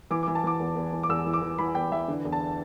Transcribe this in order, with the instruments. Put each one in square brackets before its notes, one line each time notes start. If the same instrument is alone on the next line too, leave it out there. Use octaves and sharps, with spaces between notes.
[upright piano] E3 D6
E3 D6
A5
E3 D6
E2
E2
E3
D6
E2 E6
E3
D6
E3
E3 B5
E2 G5
E3 E5
D3
E2
A5